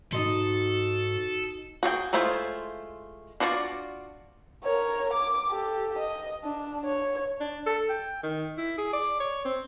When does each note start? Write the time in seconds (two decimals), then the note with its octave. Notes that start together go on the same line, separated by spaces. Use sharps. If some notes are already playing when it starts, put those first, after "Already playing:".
0.12 G#2 D#4 F#4 A4 D#5 C6
1.83 F#4 G#4 A4 G5
2.13 G#3 A3 E4 F4 C5
3.40 D4 F4 F#4 C#5 D5
4.64 A#4 C#5
5.13 D6
5.49 G4 A4
5.98 D#5
6.44 D4
6.85 C#5
7.40 D4
7.66 A4
7.90 G5
8.23 D#3
8.58 E4
8.78 G#4
8.93 D5
9.20 C#5
9.45 C4